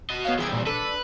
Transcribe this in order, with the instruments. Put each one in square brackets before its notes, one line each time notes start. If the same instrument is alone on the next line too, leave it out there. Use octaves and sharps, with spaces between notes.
[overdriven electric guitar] F#4 D#5
[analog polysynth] B3 C#5 F5
[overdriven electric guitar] C2 E3 [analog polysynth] G#4 G5 G#6
[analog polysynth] A#2 G3
[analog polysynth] D4 A4 [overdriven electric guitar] B4